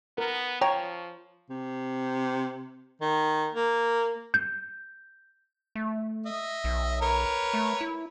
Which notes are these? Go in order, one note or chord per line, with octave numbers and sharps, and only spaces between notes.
B3 A#4
F3 C#5 G5 A#5
C3
D#3
A#3
G6
A3
D#5 E5
B1
A#4 B4 C#5
A3
E4